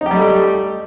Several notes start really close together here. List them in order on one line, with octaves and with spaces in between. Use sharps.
D#4 G4 G3 A3